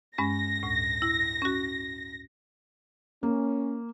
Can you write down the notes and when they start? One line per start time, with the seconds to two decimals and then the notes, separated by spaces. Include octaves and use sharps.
0.18 G2 G#3 C#4 A#6
0.63 D2 A2
1.02 E4
1.42 C#4 F#4
3.23 A#3 C#4